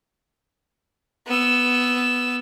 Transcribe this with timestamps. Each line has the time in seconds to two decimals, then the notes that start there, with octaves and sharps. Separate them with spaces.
1.27 B3 E6